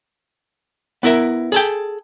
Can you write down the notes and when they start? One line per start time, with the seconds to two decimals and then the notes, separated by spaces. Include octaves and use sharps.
1.03 B3 E4 A#4 E5
1.52 G#4 A4 G5